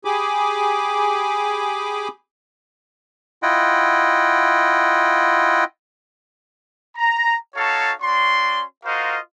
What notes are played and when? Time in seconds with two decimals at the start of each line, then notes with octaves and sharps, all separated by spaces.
0.05 G4 G#4 G#5 B5 D6
3.43 E4 F4 D#5 F#5 G5
6.97 A#5
7.56 D#4 F#4 A4 C#5 F5 A5
8.01 C#4 F#4 D5 C6
8.85 F4 F#4 A#4 C5 D#5 F5